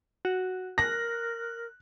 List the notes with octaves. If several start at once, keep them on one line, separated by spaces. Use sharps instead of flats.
F#4
A#4 F#6 A#6